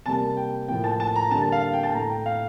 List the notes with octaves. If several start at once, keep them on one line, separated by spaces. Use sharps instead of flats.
C3 G3 A#3 A5
G5
A2 F3 A#3 G5
A5
A5
A#5
D3 G3 A#3 A5
A5
F5
F5
G5
A5
A2 A3 A#5
G5
F5